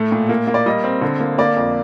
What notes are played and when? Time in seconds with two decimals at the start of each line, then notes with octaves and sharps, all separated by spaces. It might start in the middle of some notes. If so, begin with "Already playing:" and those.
Already playing: A2 A3
0.12 A#2
0.29 A#3
0.47 A#3
0.54 D5
0.66 G3 D#5
0.84 C4
1.01 D3
1.20 A#3
1.38 A#3 D5
1.57 F2